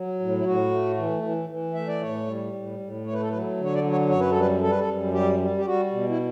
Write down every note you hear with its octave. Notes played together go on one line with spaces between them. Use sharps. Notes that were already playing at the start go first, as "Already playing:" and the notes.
Already playing: F#3
A2
E4
A2 F#4
A3
E3
E3
E3
A3 E5
D5
A2 C#5
G3
A2
A2
A3 C#5
B4
A4
F#3 B4
D3
C#5
D5
F#3
C#5
F#2 C#5
B4
A4
G3
B4
G3 A4
B4
A4
F#2
G3 G4
G3
G4
G3 F#4
B2
E4